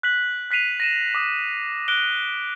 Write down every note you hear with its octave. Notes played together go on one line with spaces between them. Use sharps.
F#6 B6 F#7
F#6 B6 C7 D#7 F7
A#6 D#7 E7
D6 D#6
F#6 D7 G7